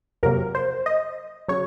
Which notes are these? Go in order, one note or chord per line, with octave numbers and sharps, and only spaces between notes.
F2 C3 F#3 A#3 A#4
C5
D#5
C#3 F#3 C#5